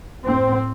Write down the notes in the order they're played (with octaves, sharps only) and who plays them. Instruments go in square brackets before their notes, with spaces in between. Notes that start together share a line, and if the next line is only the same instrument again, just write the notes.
[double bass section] A2 C4